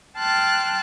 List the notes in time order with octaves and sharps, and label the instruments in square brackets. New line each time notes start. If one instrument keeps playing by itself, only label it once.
[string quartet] G5 A5 C6 F6 F#6 A6